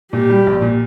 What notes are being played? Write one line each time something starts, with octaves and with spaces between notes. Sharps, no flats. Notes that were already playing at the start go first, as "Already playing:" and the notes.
A#2 G4
G3
A#1
A#2